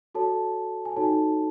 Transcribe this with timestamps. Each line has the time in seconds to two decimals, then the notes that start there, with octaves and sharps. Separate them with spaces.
0.15 F#4 A4 C#5 A5
0.85 G#5
0.96 D#4 F#4 A4 C#5 A5